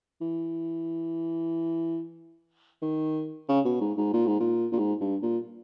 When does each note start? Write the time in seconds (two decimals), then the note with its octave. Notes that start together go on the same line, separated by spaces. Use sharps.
0.21 E3
2.82 D#3
3.49 C#3
3.65 B2
3.81 G#2
3.97 G#2
4.13 A#2
4.27 G#2
4.40 A#2
4.72 A#2
4.78 G#2
5.01 G2
5.22 A#2